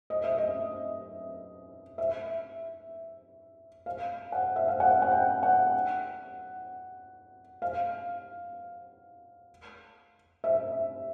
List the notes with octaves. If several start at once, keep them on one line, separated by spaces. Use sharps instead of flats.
D#5
E5
D#5
E5
F5
F#5
E5
F5
F#5
F#5
G5
F#5
F5
E5